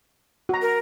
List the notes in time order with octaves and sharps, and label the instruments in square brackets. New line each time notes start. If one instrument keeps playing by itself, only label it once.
[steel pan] F#4 A#5
[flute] A#4